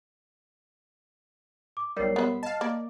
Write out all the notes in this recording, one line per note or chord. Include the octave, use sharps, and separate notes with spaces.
D6
B1 G3 A#4 C#5 C7
B3 B4 E5
D#5 F5 A5
A#3 D5